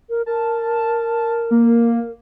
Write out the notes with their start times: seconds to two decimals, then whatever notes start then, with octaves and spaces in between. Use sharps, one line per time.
0.09 A#4
0.26 A#4 A5
1.51 A#3